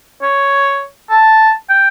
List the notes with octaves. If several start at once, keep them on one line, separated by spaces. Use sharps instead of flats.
C#5
A5
G5